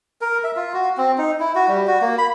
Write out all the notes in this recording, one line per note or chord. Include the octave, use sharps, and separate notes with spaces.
A#4
E5
F4
F#4
C4
D#4
E4
F#4
G3
F#4
A#3
B5